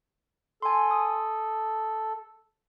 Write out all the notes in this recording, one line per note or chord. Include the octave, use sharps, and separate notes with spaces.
A4 G#5 C6
D#6